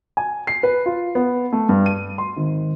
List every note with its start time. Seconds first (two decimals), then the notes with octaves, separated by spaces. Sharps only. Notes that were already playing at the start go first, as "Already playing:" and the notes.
0.17 G#5
0.47 C7
0.63 B4
0.86 F4
1.15 B3
1.53 A3
1.69 G2
1.86 D#7
2.18 C6
2.37 G#1